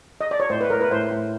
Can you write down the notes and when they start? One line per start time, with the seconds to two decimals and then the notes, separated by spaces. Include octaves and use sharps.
0.21 D#5
0.31 D5
0.40 C#5
0.50 A2 C5
0.61 B4
0.70 A2 A#4
0.81 B4
0.91 A2 C5
1.11 A2